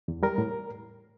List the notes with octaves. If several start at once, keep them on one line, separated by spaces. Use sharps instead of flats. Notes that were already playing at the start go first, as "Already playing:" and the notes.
E2
G3 A#4
A2